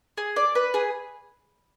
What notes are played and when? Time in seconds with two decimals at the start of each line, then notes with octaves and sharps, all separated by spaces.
0.17 G#4
0.36 D5
0.55 B4
0.74 G#4